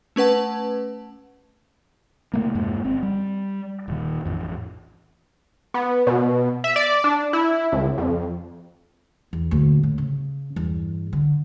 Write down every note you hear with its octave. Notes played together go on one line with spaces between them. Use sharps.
A3 C#4 B4 F#5 A5
C3 A3 A#3
E1 G2 G#3 A#3
G1 C4
G3
D#1 D#3
A1 F2
B3
B2
E5
D5
D4
E4
C#2
F2
E2
D#1 D2
A2
C#3
E2 G2
D3